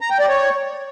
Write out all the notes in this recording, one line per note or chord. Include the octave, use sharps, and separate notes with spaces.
A#5
G5
D5
C#5